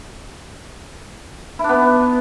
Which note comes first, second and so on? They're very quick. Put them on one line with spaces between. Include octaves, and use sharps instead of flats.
E4 D4 B3